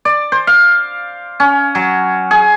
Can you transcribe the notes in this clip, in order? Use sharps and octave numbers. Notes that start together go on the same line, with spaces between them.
D5
C5
F5
C#4
F#3
G#4